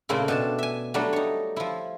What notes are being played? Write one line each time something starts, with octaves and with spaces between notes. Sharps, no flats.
A#2 C#3 A3 A#3 C4 E4
B2 D4 A5
E5 G#5
F#3 G3 A3 D4
D#4 C#5
F3 E4